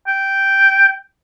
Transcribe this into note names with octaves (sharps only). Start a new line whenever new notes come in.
G5